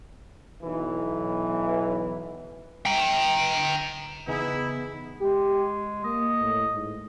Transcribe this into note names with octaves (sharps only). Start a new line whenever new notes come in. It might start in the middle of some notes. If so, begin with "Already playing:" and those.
B1 E3
G5 A#5
E2 C#3 B3 D#4 E4 G#4
G#3 G4
A#3 D#5
A2
G#2